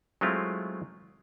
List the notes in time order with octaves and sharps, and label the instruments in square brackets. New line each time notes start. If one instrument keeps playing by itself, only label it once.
[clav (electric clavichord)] F#3 G#3 A3 C4 E4 F4